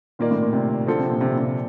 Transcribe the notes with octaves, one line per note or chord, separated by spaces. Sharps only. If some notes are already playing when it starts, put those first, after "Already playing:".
A#2 D#3 A#3 F4 A#4 D5
A2
A#2
C3
D3 F3 C4 F4 A4
C3
A#2
C3
A#2
C3
A#2